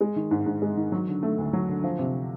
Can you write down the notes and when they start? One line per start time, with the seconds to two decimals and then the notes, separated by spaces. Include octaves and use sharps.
0.01 G#3
0.16 D#3
0.31 G#2
0.46 G#2
0.62 G#3
0.77 D#3
0.92 F#3
1.08 D3
1.23 A3
1.38 D2
1.53 F#3
1.69 D3
1.84 F3
1.99 C3